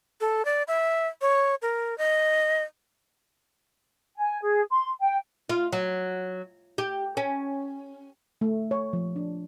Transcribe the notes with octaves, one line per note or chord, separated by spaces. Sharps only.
A4
D5
E5
C#5
A#4
D#5
G#5
G#4
C6
G5
F4
F#3
G4
C#4
A3
C#5
F3
D4